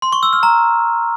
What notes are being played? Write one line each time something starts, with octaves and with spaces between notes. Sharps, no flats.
C6
C#6
E6
F6
A#5